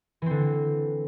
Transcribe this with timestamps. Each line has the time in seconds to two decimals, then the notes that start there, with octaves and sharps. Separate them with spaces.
0.22 E3
0.26 C4
0.30 D3